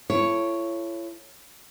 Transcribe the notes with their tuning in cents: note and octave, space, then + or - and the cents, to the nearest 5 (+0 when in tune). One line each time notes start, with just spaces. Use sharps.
E4 +40 A4 +10 C#5 +0